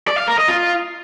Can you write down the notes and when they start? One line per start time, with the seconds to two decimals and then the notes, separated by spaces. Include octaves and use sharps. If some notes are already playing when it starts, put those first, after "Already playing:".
0.07 D5
0.18 F5
0.28 A#4
0.38 D#5
0.48 F4